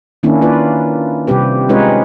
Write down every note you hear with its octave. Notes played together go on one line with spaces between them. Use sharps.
D#3 A#3 C#4 D4 E4
A#3 F4 B4 D5
C3 G3 C4 G4 B4
G#3 C#4 D#4 F4 B4 C#5